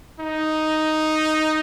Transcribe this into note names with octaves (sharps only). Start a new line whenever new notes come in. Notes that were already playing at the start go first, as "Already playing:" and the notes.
D#4